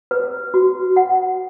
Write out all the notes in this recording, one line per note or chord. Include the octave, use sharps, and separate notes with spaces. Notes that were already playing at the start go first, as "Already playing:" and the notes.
B4
F#4
F#5